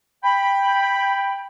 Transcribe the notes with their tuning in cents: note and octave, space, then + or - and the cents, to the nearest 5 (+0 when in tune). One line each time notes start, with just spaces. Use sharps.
G5 +10 B5 +0